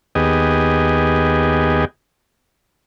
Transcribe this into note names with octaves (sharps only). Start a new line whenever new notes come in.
D#2 B3 G4 G#4 D#5